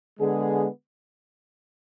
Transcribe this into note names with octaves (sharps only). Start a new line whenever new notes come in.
D3 G#3 B3 G#4